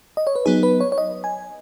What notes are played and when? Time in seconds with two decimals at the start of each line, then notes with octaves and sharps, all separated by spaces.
0.17 D#5
0.27 C#5
0.36 B4
0.46 F#3 B3 D#4 G#4
0.63 B4
0.81 C#5
0.92 C#5
0.98 D#5
1.24 G#5